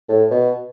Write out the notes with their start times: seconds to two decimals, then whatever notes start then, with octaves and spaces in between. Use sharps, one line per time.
0.09 A2
0.31 B2